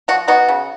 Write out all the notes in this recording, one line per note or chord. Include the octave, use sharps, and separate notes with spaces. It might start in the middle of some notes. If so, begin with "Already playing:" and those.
F3 F#4
B3 D#4 F#4
C#3